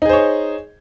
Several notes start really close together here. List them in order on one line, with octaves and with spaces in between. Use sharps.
D#4 G#4 C5 C#5